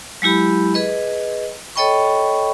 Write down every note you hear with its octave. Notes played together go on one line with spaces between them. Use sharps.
F#3 G#3 E4 G4 B5
G#4 B4 D#5
A4 C#5 D#5 G5 B5 C#6